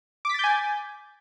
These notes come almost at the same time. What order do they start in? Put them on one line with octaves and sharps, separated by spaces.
D6 B6 A6 G6 G#5